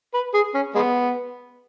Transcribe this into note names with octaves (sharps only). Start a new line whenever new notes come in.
B4
G#4
C#4
G#3 B3